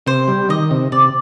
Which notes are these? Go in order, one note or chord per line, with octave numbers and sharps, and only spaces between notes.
C3 C5
G3
D#3 D#5
C3
C3 D5